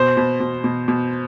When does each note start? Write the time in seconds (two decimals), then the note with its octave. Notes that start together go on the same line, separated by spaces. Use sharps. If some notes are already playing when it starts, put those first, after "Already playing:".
Already playing: B2 C5
0.17 B2
0.40 B2
0.64 B2
0.88 B2